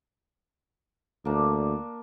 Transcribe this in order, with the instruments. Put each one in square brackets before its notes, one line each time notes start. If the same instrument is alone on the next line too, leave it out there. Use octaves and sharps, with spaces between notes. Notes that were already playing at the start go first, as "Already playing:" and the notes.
[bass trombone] D2 [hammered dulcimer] A#3 D4